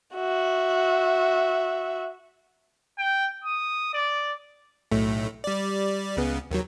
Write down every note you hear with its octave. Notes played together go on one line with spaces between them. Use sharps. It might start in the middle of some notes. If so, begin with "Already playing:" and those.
F#4 E5
G5
D#6
D5
B1 A2 A3
G3 D5
C#2 C#3 B3
D#2 D#3 F#3